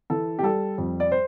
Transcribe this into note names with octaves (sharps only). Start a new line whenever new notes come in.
E3 A4
G4
G3 A4
F2
D5
C5